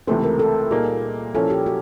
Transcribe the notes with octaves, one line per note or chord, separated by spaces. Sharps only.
C#2 C3 E3 A3 C4 A4
A#4
A4
A#2 G3 A#3 D#4 G#4
A#2 F3 A#3 C#4 E4 A4
G4
F#4